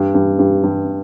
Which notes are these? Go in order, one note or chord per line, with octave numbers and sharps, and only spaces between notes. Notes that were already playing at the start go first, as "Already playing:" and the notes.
Already playing: G2
G2
G2
G2